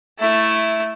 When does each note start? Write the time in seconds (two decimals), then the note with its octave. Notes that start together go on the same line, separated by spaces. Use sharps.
0.19 A3 E4